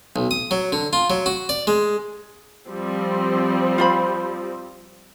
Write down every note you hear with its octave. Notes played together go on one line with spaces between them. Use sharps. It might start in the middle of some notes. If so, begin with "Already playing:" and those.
B1
D#6
F#3
D3
F4
F#3
F#4
D5
G#3
F3 G3 C4
F4 C5 B5